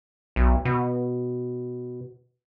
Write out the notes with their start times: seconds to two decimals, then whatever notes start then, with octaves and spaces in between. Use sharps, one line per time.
0.36 B1
0.65 B2